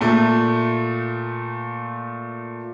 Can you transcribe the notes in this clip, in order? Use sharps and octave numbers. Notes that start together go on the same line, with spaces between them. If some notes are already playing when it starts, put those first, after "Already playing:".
A#2 A3